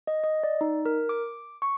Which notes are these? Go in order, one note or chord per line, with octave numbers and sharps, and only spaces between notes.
D#5
D#5
D5
D#4
A#4
D6
C#6